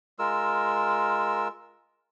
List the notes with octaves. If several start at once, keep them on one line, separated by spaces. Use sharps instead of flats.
G#3 F4 A#4 E6